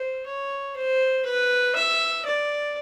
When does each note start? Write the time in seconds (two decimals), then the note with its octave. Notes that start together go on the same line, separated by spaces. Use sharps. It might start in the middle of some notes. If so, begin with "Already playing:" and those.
Already playing: C5
0.26 C#5
0.76 C5
1.25 B4
1.75 E5
2.25 D5